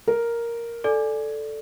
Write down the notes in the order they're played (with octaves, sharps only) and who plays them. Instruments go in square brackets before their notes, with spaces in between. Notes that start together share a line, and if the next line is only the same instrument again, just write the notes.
[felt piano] A#4
[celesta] A4 D5 [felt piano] G#5